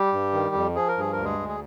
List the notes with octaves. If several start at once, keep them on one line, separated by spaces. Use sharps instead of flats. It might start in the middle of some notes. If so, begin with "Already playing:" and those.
Already playing: G3 G4
G2
D#3
F2
F3 G#4
A#4
G2 G#4
D2 A#4
G#3 G#4
D2
G#4